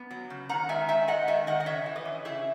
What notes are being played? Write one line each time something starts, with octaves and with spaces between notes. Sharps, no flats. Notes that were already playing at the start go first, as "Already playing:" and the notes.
Already playing: B3
F#3
C#3
D#3 F#5 A#5
G#3 E5 G#5
D#3 E5 G#5
G#3 D#5 F#5
D#3 E5 G#5
D#3 D#5 F#5
D#5
C#3 C#5 E5
E3
B4 D#5
E3
C#3 E4 G#4